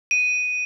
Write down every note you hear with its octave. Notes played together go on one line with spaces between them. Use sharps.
D#7